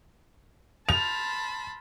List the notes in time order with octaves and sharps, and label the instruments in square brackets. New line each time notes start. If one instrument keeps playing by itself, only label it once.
[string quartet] A5 B5 C6 [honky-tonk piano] F7